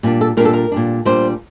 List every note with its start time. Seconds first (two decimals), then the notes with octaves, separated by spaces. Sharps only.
0.03 A#2 G3 D4
0.21 A4
0.37 A#2 G3 D4 A#4
0.45 A4
0.53 A#4
0.72 A#2 G3 D4
1.05 A#2 G3 D4 C5